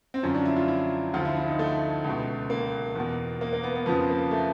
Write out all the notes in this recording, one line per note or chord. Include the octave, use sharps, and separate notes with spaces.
C4
F#2 D3 F3 C#4
D4
E4
F4
E4
D2 D3 F3 F4
E4
E4
D#4
A3
C#2 B2
A#3
E2 B2
A#3
A#3
B3
B3
F2 C#3 F3 B3
A#3
A3